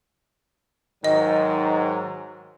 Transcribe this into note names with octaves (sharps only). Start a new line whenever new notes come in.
G#2 D#3 F#3 D#5